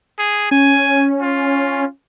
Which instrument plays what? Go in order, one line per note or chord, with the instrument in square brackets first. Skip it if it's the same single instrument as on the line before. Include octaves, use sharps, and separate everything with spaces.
[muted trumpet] G#4
[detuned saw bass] C#4 [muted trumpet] G#5
[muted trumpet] F4